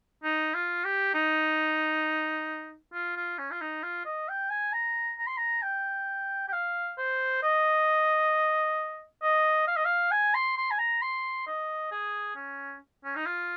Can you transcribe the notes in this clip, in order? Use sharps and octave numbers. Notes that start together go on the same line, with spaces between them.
D#4
F4
G4
D#4
F4
F4
C#4
F4
D#4
F4
D#5
G5
G#5
A#5
A#5
C6
A#5
G5
G5
F5
C5
D#5
D#5
F5
D#5
F5
G#5
C6
C6
G#5
A#5
C6
D#5
G#4
C#4
C#4
D#4
F4